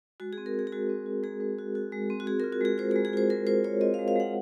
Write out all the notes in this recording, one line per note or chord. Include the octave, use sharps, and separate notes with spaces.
G#3 F#4
G#4
C4
A#4
C4 G#4
G#4
G#3 F#4
C4
F#4
G#3 G#4
G#3
F#4
F#4
G#3
C4
F#4
C4 G#4
F4 A#4
F#4
G#3 G#4
F4 C5
G#3 G#4
G#4
F4 C5
G#3 A#4
F4 C5
F4 C#5
C4 D#5
F5
G#3
F5
G#3 F#5